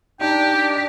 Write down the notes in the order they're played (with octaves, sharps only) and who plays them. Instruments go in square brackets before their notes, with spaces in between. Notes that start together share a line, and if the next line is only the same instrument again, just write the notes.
[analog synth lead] D4 [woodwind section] D#4 [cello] G4 [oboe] G5